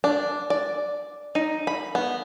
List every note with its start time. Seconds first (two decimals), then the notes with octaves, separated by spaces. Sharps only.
0.04 D4
0.50 D5
1.35 D#4
1.67 B5
1.95 B3